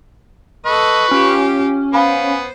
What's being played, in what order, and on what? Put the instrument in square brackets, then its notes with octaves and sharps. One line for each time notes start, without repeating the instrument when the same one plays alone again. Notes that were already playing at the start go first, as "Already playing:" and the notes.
[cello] A4 D#5 [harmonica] B4 C#6
[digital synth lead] C#4 [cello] F4 G4
[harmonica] B3 [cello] C5 [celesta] F5 G#5 B5